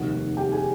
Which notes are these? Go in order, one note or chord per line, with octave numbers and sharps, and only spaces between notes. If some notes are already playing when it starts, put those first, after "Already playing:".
Already playing: F1 D#2 D#3 G3 F#4 F#5
G4 G5
G#4 G#5